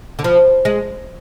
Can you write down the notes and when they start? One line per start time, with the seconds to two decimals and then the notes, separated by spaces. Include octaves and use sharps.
0.19 D3
0.24 F3
0.65 G#3